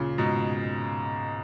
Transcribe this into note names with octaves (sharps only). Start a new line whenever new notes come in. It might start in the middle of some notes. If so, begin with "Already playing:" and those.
Already playing: A#2 C#3
G#2 B2